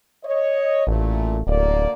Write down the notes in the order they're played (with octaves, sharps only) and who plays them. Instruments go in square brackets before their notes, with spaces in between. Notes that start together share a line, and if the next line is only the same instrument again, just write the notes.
[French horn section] C#5 D#5
[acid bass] A1 [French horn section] A#2 A3
[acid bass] D1 [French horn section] D2 A#3 D5